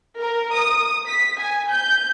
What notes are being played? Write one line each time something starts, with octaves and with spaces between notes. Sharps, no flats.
A#4
D#6
B6
G#5
G6